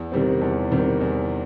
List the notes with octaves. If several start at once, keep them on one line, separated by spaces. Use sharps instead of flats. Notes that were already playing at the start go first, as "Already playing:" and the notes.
Already playing: E2
C3 D#3 G3 C4
E2
C3 D#3 G3 C4
E2